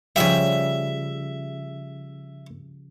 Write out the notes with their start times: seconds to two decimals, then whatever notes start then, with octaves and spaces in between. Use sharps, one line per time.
0.16 C#3 F3 G3 E5